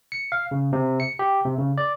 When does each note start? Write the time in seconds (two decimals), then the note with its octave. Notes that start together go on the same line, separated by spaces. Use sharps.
0.12 C#7
0.32 F5
0.51 C#3
0.73 C3
1.00 C#7
1.19 G4
1.45 C3
1.58 C#3
1.78 D5